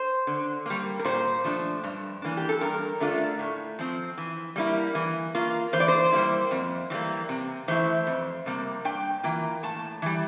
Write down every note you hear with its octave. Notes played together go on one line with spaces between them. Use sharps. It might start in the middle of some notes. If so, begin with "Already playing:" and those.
Already playing: C5
D3
G3 A#3
A#4
A#2 C5
F3 A3 D4
G2
E3 A#3 D4
G4
A4
G2 A#4
D3 A3 D4 F4
A2
F3 C4
E3
G3 A#3 E4
E3
A#3 F4
E3 C5
D5
C5
G3 A#3 E4
F2
E3 G3 A#3
C3
E3 A3 E4 C5
F2
C3 G3 A#3
G2 G5
E3 A#3 F4
A2 A5
E3 G3